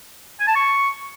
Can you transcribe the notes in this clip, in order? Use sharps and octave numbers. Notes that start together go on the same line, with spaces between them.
G#5
A5
C#6